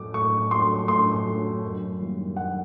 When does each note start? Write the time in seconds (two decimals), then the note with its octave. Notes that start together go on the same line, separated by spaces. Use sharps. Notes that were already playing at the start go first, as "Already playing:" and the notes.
Already playing: A2 F#3 A3 D6
0.14 A2 C#6
0.51 F#3 A3 C6
0.88 A2 C6
1.25 F#3 A3
1.63 F#2
2.00 D#3 G3 A#3
2.36 F#2 F#5